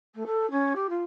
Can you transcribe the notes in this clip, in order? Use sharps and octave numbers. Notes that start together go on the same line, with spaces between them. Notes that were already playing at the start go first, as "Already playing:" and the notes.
A3
A4
C#4
G4
F4